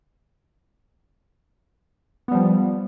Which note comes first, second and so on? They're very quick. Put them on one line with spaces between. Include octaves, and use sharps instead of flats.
B3 G3 F3